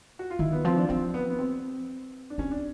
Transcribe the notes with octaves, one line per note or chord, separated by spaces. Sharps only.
F#4
F4
D#3 E4
B3
F3 C4
D4
F3 C4
B3
B3
C4
D4
C4 C#4
D4